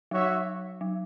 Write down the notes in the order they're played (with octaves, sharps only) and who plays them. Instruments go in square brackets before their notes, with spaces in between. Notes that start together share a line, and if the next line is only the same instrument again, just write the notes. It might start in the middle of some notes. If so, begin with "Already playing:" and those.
[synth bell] F#3 [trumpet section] F#4 C#5 E5
[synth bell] F#3